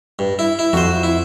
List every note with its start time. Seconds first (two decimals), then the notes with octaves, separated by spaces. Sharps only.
0.19 G2
0.39 E4
0.59 E4
0.73 F2 F#4 C5
1.03 E4